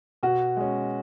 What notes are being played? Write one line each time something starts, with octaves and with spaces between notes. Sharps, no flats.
B2 F#4
G#3 C#4